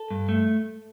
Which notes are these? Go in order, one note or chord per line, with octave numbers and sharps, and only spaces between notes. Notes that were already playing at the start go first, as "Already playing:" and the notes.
Already playing: A4
G2
A3